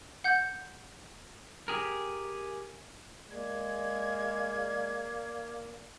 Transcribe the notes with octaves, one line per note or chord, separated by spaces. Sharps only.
F#5 G6
G4 G#4 A#4
G#3 A#3 D5 G#6